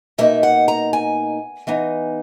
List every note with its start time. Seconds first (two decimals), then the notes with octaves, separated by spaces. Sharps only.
0.18 B2 A#3 D#4 E5
0.43 F#5
0.68 A#5
0.93 G#5
1.67 E3 B3 D#4